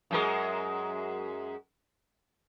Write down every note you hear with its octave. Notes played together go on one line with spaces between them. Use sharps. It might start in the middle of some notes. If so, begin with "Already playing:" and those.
F#2 G#3 A#4